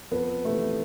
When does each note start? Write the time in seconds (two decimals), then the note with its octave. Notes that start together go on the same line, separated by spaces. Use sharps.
0.11 F2 B3
0.45 C3 E3 A3